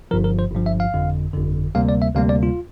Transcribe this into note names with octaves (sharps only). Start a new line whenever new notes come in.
G1 G2 F3 A#4
A#4
C5
G1 G2 F3
E5
F5
G1 F2 D3
G1 F2 D3
D2 C3 G3 A#3 F5
D5
E5
D2 C3 G3 A#3 F5
D5
F4